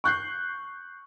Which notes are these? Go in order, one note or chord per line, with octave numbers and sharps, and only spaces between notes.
C#6 F#6 G6 C7